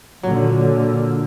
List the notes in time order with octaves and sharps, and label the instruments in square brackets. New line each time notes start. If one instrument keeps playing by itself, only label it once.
[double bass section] A#2 D3 [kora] F#3